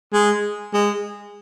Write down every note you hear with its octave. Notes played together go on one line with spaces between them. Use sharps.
G#3
G#3